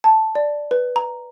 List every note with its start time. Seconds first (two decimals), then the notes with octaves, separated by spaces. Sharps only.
0.04 A5
0.35 D5
0.71 B4
0.96 A#5